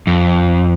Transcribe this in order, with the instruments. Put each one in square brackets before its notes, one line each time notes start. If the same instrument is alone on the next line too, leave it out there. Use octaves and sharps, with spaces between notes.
[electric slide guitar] F2